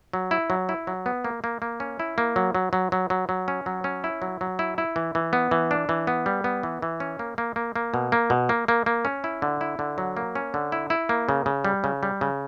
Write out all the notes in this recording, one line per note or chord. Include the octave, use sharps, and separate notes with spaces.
F#3
E4
F#3
E4
F#3
B3
A#3
A#3
A#3
C#4
E4
A#3
F#3
F#3
F#3
F#3
F#3
F#3
C#4
F#3
C#4
E4
F#3
F#3
E4
E4
E3
E3
B3
E3
D4
E3
B3
G3
B3
E3
E3
C#4
A#3
A#3
A#3
A#3
B2
A#3
B2
A#3
A#3
A#3
C#4
E4
D3
E4
D3
F#3
A#3
C#4
D3
E4
E4
A#3
C#3
C#3
G3
C#3
G3
C#3